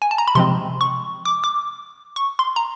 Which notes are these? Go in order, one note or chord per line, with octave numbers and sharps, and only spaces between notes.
G#5
A5
A#5
B5
C3 F3 G#3 C4 C6
C#6
D6
D6
C#6
C6
A#5